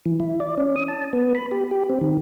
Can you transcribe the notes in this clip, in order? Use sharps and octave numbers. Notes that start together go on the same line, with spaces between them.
E3
E4
D5
C#4
D#6
A5
B3
B5
G4
G4
C4
D#3